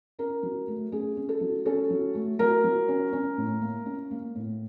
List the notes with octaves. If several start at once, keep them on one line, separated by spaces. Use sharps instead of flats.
C#4 A#4
F#3
A3
C#4 G#4
C#4
A4
F#3
C#4 A4
F#3
A3
F#3 A#4
F#3
C#4
C#4
A2
A#3
C#4
A#3
A2